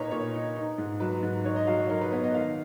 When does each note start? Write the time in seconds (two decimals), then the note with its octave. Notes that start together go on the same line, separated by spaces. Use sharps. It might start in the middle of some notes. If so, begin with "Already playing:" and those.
Already playing: A#2 D#4 A#4 B4 C#5
0.11 A#2 C#5
0.34 D#4
0.56 D#4
0.78 G#2
1.00 F#3 B4
1.23 G#2
1.45 D#4 C#5
1.56 D#5
1.67 F#3 F5
1.79 C#5
1.89 D#4 A#4
2.01 B4
2.12 B3 C#5
2.24 D#5
2.34 D#3 F5